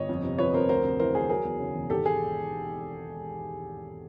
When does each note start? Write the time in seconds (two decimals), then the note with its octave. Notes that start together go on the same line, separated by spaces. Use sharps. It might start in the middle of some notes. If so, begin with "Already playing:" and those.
Already playing: G1 C#5 D#5
0.09 F2
0.24 C3
0.39 F3 B4 C#5
0.54 F2 A#4 C5
0.69 D2 A#4 C5
0.84 C3
1.00 E3 A#4 C5
1.15 D2 G#4
1.29 F#3 G#4 A#4
1.45 E2
1.60 C#3
1.75 E1
1.90 G#1 G4 A4
2.06 G#4